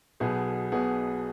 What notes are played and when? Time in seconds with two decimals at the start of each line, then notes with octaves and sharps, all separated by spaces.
0.20 B1 B2 B3 G#4
0.72 B1 B2 B3 G#4